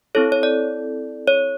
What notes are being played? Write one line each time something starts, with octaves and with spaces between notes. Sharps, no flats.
C4 E4 A4 C#5
C#5
D5
C#5